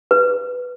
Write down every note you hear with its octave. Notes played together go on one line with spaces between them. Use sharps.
B4